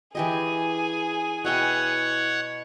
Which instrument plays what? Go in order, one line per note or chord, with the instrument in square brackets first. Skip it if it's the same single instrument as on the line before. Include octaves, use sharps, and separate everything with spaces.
[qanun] E3 G4 D#5 [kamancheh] G#4 G#5
[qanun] B2 E4 G5 [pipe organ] C#5 F#5